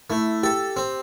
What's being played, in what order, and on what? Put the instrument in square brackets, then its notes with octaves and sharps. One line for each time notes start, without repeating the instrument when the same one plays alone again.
[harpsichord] A3 [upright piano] E4
[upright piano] G4 [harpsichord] A4
[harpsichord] C4